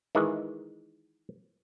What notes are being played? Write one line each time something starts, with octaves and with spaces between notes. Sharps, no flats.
D#3 E3 G#3